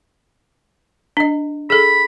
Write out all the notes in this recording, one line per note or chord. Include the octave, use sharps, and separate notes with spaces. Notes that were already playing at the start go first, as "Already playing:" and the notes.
D4 D#5
G#4 A4 B5